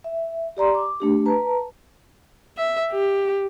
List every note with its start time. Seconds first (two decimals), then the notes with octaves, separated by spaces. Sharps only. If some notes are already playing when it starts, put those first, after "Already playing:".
0.04 E5
0.57 G4 D5 A#5 C6
0.75 D6
1.00 A3 D4 G4
1.26 B4 A5 A#5
2.57 E5
2.92 G4